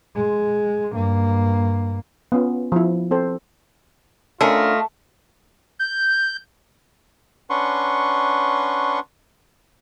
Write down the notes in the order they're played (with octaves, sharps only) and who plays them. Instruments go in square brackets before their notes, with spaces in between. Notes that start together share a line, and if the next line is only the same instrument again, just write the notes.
[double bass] G#3
G2 A#3
[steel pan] B3 C#4 F4
F3 E4
C4 A4 C5
[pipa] D3 C#4 A#4 [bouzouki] A3 [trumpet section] F4 D#5 F5
[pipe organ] G6
[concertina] C#4 D4 B4 F#5 C6 C#6